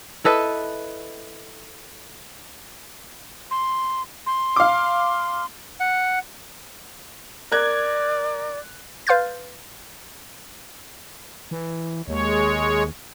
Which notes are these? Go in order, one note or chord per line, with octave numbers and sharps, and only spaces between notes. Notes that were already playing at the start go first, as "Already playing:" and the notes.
E4 A4 B4 D#5
C6
C6
F5 D6
F#5
A#4 D5 F#6 G#6
B4 F5 C6 F6 G6 A6
E3
D#2 G#3 C#5